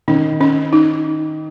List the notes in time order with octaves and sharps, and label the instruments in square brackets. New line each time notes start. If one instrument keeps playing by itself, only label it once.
[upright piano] D#3 [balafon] C#4
[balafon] C#4
D#4